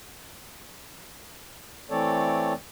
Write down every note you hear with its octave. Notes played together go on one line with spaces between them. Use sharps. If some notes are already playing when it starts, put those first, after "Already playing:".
E3 A3 C4 A4 C#5 D5